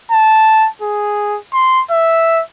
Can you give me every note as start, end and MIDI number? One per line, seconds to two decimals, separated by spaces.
0.12 0.69 81
0.82 1.38 68
1.54 1.82 84
1.91 2.42 76